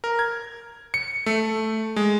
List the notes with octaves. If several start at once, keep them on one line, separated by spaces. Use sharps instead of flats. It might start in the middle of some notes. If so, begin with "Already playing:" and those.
A#4
G#6
C#7
A3
G#3